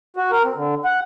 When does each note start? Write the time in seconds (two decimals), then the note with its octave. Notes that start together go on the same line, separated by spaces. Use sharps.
0.17 F#4
0.31 A#4
0.44 C4
0.55 D3
0.84 F#5